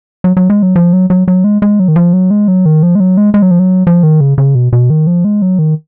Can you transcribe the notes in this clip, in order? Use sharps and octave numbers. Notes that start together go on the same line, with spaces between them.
F#3
F#3
G#3
F#3
F3
F#3
F#3
F#3
G#3
G#3
F#3
D#3
F3
F#3
G#3
F#3
D#3
F3
G#3
F#3
G#3
G#3
F#3
F3
F#3
F3
D#3
C#3
C#3
B2
B2
D#3
F3
G#3
F#3
D#3